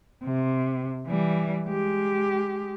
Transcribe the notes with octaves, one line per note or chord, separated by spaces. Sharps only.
C3
E3 G3
G#3 G4